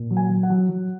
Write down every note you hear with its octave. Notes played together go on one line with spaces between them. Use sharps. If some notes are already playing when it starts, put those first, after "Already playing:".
Already playing: A#2
F#3
G#5
F#3
F#5
F#3
F#3